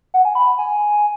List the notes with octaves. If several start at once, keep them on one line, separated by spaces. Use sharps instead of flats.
F#5
G#5
B5
G#5